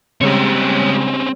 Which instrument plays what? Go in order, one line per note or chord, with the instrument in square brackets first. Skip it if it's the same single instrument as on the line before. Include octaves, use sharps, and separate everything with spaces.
[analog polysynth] C#3 G3 G#3 [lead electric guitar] C4 C#4 [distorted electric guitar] G4 C#5